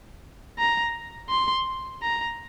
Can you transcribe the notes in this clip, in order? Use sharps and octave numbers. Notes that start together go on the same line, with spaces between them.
A#5
C6
A#5